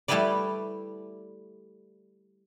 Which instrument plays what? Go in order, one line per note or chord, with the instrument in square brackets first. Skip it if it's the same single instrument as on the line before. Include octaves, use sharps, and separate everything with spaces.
[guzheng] G3 A3 E4 G4 B4 D5